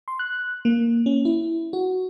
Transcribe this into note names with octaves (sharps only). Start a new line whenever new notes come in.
C6
F#6
A#3
C#4
E4
F#4